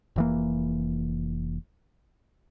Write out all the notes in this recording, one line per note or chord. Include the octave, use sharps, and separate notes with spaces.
F1 E3 A#3